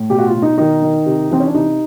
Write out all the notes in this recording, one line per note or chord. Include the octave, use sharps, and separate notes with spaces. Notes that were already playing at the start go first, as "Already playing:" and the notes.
Already playing: A2
B2 G4
F#4
F4
B2
D#4
D#3 D#4
D#3
C3
E3 C4
C#4
D4
C3 D#4